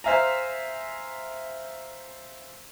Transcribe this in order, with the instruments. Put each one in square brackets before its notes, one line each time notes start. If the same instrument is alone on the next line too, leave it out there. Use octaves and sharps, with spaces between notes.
[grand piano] C5 E5 F5 G#5 A#5